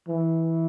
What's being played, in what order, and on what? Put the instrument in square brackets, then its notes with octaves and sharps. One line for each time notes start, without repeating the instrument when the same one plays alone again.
[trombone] E3